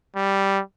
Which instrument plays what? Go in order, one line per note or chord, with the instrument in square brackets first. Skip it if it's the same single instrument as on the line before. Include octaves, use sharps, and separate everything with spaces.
[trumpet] G3